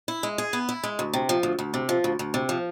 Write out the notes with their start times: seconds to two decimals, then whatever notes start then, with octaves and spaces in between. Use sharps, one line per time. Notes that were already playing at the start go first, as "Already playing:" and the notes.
0.08 E4
0.23 G#3
0.38 G#4
0.53 B3
0.69 E4
0.84 G#3
0.99 D2
1.14 C3
1.29 F3
1.43 D2
1.59 D2
1.74 C3
1.89 F3
2.04 D2
2.19 D2
2.34 C3
2.49 F3